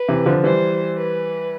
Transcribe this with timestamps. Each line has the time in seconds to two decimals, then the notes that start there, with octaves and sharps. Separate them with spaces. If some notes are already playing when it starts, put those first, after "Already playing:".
Already playing: B4
0.08 C3 E3
0.26 D3 F3
0.44 E3 G3 C5
0.97 B4